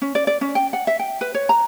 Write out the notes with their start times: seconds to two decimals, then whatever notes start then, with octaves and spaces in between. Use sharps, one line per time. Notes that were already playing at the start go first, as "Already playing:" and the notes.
0.02 C#4
0.15 D5
0.27 D5
0.41 C#4
0.55 G5
0.73 F#5
0.87 E5
0.99 G5
1.21 B4
1.35 C#5
1.49 A#5